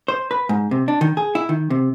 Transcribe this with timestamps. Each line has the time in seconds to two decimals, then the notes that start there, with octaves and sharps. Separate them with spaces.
0.08 C5
0.31 B4
0.49 G#2
0.71 C3
0.88 D4
1.01 D#3
1.17 G#4
1.35 E4
1.49 D#3
1.70 C3